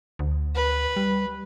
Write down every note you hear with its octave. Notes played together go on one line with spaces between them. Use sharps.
D2
B4
G3